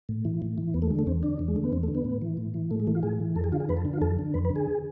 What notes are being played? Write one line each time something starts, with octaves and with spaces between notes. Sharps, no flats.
A2
E3
A2
E3
E2 B3
A3
D3 G#3
A3
E2 C4
D3 D4
E2
G#3
D3 A3
B3
E2 C4
A3
D3
B3
A2
E3
A2
E3
A2 A3
G#3
E3 A3
F4
A2 G#4
E3
F2 A4
G#4
D3 F4
G#4
F2 B4
A4
D3
F4
F2 A4
D3
F2 B4
B4
D3
G#4